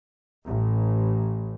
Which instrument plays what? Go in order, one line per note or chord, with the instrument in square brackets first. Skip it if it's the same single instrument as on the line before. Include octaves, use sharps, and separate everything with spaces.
[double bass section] A1